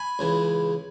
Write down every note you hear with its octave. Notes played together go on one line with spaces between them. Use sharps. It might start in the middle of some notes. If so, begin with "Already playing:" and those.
Already playing: G#5 B5
C#2 C#3 E3